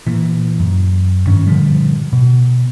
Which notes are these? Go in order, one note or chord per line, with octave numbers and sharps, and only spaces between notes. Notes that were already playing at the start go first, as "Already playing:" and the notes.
A#2 E3
F#2
G2 D#3 C#4
A#2 D3 F3 G3
B2